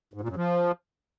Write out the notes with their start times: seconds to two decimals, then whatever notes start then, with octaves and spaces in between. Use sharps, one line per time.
0.14 G#2
0.21 A#2
0.29 F#2
0.36 F3